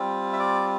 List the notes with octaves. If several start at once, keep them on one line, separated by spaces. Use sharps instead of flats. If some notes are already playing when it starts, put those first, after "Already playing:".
Already playing: G3 C4 F4
E5
D5